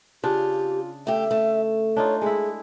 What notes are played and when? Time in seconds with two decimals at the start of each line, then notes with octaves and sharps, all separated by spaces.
0.24 C#3 D4 F4 G4
1.07 A3 G4 E5
1.31 A3
1.96 D4 D#4 F4 C#5
2.22 G#3 E4 G#4